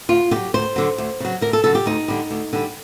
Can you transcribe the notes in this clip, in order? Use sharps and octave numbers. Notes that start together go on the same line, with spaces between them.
D2 F4
D3 F#3 G4
D2 C5
D3 F#3
D2
C#3 F#3
D2 A#4
A4
C#3 F#3 A4
G4
D2 D#4
D3 G3
D2
D3 G3